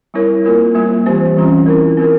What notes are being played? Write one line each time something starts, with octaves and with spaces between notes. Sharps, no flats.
G3 C4 E4 A#4 C#5
A#3 F4 A#4
G3 A#3 F4
E3 G3 C4 G4 C5
E3 G3 C#4 F4
C4 E4 A#4
C4 F4 A#4